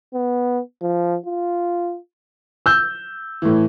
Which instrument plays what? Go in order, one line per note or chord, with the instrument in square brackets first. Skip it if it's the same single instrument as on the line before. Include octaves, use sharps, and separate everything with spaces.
[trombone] B3
F3
F4
[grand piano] E6 G6
[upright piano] A2 E3